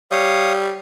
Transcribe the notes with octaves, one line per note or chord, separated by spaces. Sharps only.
G3 C#5 F5 D#6